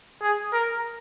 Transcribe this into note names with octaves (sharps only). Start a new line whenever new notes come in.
G#4
A#4